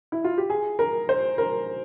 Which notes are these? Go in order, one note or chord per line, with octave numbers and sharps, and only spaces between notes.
E4
F4
G4
G#4
A#4
C5
A#4